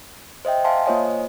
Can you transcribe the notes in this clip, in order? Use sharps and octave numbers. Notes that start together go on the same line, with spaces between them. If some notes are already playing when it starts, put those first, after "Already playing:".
C5 D#5 E5 G5
E5 F5 G#5 A5 C6
A#3 F4 C5 C#5 D#5 G#5